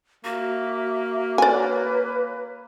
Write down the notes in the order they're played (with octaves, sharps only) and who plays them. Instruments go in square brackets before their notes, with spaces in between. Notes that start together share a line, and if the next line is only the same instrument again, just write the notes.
[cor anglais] A#3 [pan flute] F#4 [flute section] E5
[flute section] B4 C#5 [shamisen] D5 G#5